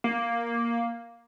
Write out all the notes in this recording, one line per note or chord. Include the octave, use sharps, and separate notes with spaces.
A#3